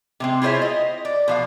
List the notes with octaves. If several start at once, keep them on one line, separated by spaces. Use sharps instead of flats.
C3 G#3 C4
E4 F4 G#4 C5 C#5 E5
D#5
D5
B2 F3 F5